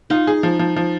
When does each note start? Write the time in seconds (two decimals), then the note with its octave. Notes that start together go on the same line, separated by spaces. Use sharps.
0.10 D#4 F4
0.27 G#4
0.43 F3
0.59 F3
0.76 F3